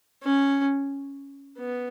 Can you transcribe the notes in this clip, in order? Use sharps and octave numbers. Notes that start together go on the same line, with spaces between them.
C#4
B3